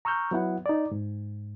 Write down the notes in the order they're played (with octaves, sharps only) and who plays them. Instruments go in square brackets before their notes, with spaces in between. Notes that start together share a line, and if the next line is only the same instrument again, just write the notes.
[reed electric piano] A#5 C#6 E6 F6 G6
F#3 B3 E4 F#5
D#4 D5
G#2